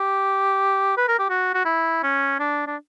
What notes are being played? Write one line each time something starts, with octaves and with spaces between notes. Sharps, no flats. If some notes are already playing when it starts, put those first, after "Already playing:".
Already playing: G4
B4
A#4
G4
F#4
F#4
E4
C#4
D4
D4